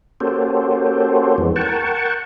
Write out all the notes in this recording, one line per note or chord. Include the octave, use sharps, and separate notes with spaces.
A#3 C#4 F#4 G4 A4 C5
F2 E3 G#3 B3
A#4 F#5 G5 A5 C#6